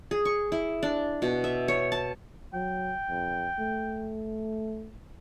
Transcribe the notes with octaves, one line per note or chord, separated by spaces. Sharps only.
G#4
C#6
E4
D4
B2
E5
C#5
A5
F#3 G5
F2
A3